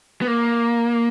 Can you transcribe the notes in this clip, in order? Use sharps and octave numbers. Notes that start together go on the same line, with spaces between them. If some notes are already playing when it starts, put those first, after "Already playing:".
B3
A#3